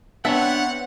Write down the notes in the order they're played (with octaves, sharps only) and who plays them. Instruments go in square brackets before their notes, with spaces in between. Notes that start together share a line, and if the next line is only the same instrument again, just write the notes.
[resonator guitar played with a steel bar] B3 [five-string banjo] C4 E5 A5 [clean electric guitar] D4 C#5 [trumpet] F#5